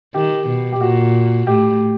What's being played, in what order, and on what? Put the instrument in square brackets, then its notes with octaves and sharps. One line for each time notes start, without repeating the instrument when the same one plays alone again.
[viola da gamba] D#3 [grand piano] G4
[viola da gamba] B2
[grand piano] G4
[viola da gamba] A#2 [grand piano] F#4
[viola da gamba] A2 [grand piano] G4